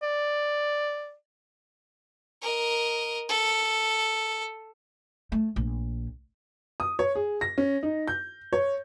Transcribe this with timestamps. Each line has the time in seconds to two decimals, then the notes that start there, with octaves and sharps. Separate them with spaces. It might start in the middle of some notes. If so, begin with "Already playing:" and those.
0.03 D5
2.42 A#4 D#5
3.28 A4
5.32 A3
5.56 A#1
6.80 D#6
6.99 C#5
7.15 G#4
7.41 A#6
7.58 C#4
7.83 D#4
8.08 G6
8.53 C#5